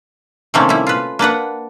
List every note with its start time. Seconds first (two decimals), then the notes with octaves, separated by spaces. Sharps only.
0.54 C3 D#3 A3 A#3 C4 C#4
0.69 G3 E4
0.87 F4 B4
1.19 A#3 D4 B4 F#5